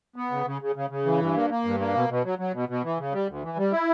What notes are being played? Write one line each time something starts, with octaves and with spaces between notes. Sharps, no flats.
B3
C#3
C#3
C#3
C#3
C#3
E3
G2
A#3
A#3
G2
A#3
B2
B2
F#3
F#3
B2
B2
E3
C#3
G3
D2
E3
G3
E4